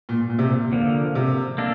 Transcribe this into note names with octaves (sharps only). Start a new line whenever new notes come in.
A#2
A#2
C3
A#2
D3 F3 A#3
C3
A#3 D4 A4